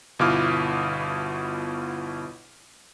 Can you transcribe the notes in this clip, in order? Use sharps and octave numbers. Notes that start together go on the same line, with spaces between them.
G1 B2 E4 F4 D6 F6